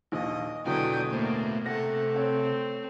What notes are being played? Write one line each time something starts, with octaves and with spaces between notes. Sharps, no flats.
A#1 D#2 D#5
E2 B2 D3 F#3 D5 G5 G#5 D#6
A2 A#3 C5
C3 A3 A4 F#5 A#6
C4 C#5